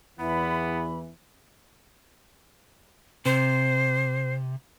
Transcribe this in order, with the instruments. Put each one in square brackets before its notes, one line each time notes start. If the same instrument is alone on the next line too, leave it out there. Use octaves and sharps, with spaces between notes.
[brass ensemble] E2 E3 [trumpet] B3 [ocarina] B5
[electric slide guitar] C3 [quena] C5